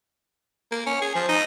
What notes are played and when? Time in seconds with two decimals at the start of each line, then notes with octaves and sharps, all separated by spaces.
0.71 A#3
0.86 C#4
1.01 G#4
1.15 F3
1.29 D#4